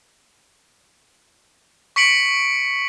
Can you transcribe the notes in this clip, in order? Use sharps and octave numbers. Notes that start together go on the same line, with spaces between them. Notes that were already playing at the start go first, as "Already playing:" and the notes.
C#6 B6 C#7 D7 F#7